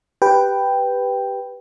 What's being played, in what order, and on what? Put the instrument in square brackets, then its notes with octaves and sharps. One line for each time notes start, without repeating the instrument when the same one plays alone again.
[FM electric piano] G4 B4 G5